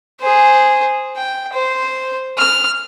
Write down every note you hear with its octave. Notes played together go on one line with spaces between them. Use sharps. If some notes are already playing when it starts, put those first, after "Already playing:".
G#4 C5
G5
C5
F6